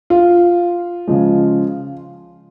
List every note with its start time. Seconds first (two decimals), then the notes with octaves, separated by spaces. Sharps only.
0.10 F4
1.07 C#3 F3 G#3